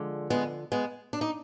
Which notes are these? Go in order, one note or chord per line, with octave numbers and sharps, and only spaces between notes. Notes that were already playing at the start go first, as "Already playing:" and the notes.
Already playing: D3 F3 G#3
G#3 B3
G#3 B3
D4
D#4